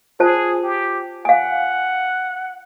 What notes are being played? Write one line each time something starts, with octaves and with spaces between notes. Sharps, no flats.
F4 G#4 C5 A5
G4
F5 F#5 G#5